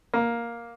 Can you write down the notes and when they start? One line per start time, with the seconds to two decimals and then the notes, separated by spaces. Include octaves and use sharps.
0.14 A#3